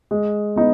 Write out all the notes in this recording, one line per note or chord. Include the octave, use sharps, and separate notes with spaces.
G#3
B3 D#4